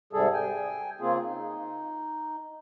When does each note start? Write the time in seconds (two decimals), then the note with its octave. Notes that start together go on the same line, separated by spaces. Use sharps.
0.13 G#2 C3 G3 G#4 A4
0.33 G5 G#5
1.01 C#3 A#3 C4 F4 G#4
1.24 D#4